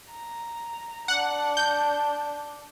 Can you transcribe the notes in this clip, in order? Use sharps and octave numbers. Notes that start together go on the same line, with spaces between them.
A#5
D4 F#5
G6